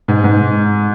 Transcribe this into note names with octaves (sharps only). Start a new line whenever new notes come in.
G#2
G#2